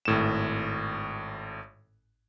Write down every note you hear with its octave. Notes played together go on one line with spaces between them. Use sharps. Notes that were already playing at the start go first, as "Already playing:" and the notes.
G#1 A2 E7